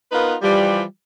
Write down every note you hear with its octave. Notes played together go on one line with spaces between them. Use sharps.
B3 D#4 F4 A#4 B4
E3 F3 G3